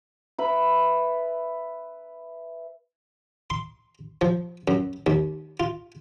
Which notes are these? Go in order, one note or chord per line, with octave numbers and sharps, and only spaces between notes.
B4 E5 B5
C6
F3
F#2
D#2
F4